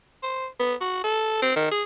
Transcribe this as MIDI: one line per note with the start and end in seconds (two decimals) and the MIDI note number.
0.23 0.47 72
0.60 0.74 59
0.81 1.04 66
1.04 1.42 69
1.42 1.53 60
1.56 1.70 51
1.71 1.83 68